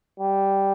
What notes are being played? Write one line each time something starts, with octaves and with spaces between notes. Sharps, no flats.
G3